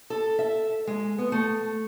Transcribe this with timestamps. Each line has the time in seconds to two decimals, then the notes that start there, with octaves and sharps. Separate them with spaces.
0.10 A4
0.39 E5
0.87 G#3
1.18 B3
1.32 A3